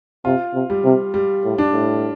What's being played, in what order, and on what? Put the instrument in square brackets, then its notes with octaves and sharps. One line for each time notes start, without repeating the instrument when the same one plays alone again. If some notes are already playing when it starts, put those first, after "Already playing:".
[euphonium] C3 [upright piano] F4
[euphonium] C3
[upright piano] G3
[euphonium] C3
[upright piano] G3
[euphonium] A2
[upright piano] D4
[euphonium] A2